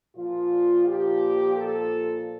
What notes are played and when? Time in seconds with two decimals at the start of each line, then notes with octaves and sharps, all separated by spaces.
0.16 A#2 F3 F4
0.85 G4
1.54 A4